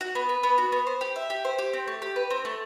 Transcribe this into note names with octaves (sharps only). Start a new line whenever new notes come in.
F#4
B3
B4
B3
F#4
B3
C5
G4
E5
G4
C5
G4
C4
A3
G4
B4
C4
A3